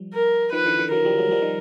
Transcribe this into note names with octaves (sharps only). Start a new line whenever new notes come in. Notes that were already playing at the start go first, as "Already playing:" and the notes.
Already playing: F3 G3
A#4
D#3 F3 B4
D3 E3
D3 E3
E3 F#3 A#4
F3 G3
F#3 G#3
F3 G3
D#3